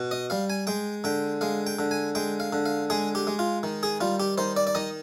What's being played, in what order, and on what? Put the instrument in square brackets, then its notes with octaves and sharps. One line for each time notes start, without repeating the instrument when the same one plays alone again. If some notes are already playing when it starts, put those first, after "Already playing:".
Already playing: [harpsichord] B2
D#5
G3 F5
G#5
G#3 G5
D3 G5
G#3 F5
G5
D3
G#5
G#3 G5
F5
D3
F5
G#3 G#4
G4
G#3
F4
D#3
G#4
G3 F4
G4
D#3 C5
D5
D5
D#3 D#5